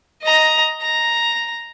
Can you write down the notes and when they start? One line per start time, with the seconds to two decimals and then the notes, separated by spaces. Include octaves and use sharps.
0.22 D#5 A#5
0.82 A#5